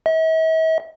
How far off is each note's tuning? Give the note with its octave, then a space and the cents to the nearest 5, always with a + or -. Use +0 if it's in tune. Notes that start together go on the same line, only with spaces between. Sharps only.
E5 -45